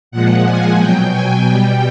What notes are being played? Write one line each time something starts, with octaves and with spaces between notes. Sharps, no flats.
A#2 F3 G#3 F#5
G#5
B2 F#3 G5
G#5
B2 G3 G5